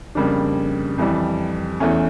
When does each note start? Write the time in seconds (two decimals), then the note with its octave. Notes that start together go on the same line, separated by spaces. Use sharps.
0.15 F2 C#3 G3 A#3 D4
0.98 F2 E3 G3
1.80 E2 E3 A3 C#4